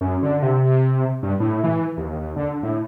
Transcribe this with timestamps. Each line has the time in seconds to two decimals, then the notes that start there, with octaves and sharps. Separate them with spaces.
0.01 F#2
0.23 D3
0.42 C3
1.23 G2
1.40 A2
1.64 E3
1.97 D#2
2.36 D3
2.63 A2